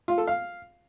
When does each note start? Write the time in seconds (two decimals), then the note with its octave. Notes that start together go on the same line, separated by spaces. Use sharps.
0.08 F4
0.18 A4
0.27 F5